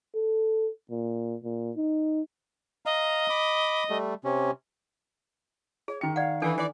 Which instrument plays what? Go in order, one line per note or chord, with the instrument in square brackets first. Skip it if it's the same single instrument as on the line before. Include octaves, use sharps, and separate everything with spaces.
[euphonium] A4
A#2
A#2
D#4
[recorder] D#5 [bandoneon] F5 A#5
[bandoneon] B5 D6
G3 A3
C3 C#4
[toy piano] G#4 [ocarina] C#5
[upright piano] D#3 C#7 [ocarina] G5
[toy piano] D5 F#5 [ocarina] F5
[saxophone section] E3 [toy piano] D4 A4 G#5
[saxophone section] E3 D5